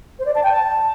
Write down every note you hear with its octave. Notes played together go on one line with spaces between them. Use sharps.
C5
D5
A5
G5
A5